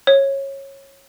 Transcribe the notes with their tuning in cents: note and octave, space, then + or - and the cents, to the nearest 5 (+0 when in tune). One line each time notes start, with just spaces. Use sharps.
C#5 -20